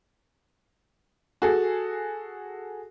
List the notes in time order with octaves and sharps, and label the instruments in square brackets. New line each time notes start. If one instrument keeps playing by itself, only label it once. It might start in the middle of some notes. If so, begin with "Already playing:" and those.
[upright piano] F#4 G#4 A4